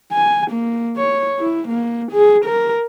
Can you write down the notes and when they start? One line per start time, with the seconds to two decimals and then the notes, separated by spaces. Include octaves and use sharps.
0.12 G#5
0.51 A#3
0.97 C#5
1.40 E4
1.68 A#3
2.12 G#4
2.45 A#4